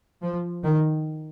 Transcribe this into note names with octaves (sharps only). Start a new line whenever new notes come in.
F3
D#3